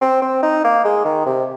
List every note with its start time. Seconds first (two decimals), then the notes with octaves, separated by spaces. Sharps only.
0.01 C4
0.22 C4
0.43 D#4
0.64 A#3
0.85 G#3
1.05 D#3
1.26 C3